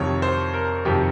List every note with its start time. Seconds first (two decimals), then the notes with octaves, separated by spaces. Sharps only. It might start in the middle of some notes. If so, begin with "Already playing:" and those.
Already playing: F2 C3 D#3 C#5
0.22 C5
0.54 A#4
0.85 F2 C3 D#3 G4